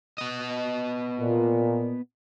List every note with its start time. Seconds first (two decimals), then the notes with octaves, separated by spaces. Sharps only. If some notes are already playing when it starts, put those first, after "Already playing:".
0.18 B3 D#5
1.19 A#2